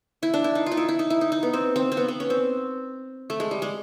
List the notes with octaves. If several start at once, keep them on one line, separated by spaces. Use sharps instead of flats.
E4
D4
E4
D#4
F4
D#4
E4
E4
D#4
E4
D#4
D#4
B3
C4
C4
C4
B3
B3
C#4
C4
A3
G#3
G3
G#3